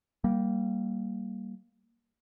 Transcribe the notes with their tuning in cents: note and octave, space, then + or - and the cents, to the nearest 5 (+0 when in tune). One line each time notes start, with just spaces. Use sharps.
G3 -15 A#3 +0